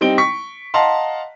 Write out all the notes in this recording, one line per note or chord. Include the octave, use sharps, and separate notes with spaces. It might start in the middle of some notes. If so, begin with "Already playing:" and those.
G3 C4 D#4 D7 G7
C#6 B6
D#5 F5 F#5 A5 A#5 C6